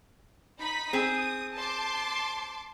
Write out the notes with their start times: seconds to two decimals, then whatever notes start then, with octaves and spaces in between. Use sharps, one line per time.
0.61 D#4 B5 B6
0.93 C4 G#4 D#6
1.55 A5 C6 D6